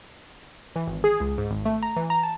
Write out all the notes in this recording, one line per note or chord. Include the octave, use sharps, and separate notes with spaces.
E3
G#1
G#4
C#2
G#2
G#1
A3
A#5
E3
A#5
A5